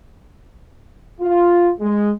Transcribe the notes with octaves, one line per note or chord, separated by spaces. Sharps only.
F4
G#3